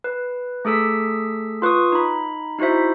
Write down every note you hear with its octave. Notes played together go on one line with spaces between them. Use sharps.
B4
A3 G#4 A4 E6 B6
F4 B4 C#6 D#6
D#4 B5
D#4 E4 F#4 C5 E5